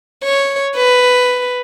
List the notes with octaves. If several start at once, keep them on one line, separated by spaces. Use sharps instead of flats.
C#5
B4